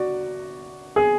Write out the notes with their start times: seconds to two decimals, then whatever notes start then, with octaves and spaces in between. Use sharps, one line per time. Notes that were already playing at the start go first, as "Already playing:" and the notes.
Already playing: F#4 D5
0.96 G#4